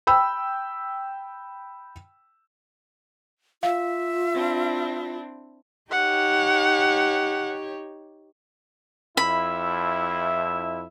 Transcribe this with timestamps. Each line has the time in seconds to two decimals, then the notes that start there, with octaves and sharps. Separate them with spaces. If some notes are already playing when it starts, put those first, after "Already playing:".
0.07 G5 B5 E6
3.63 F4 E5 F5
4.35 C4 D4 E4
5.91 D#4 G4 C#5 F#5
9.17 F2 E4 E5 B5